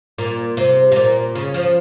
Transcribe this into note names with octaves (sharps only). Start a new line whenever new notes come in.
A#2
C3
C3
A#2
C#3
F3